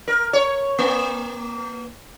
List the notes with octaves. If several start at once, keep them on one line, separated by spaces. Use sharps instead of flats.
A#4
C#5
A#3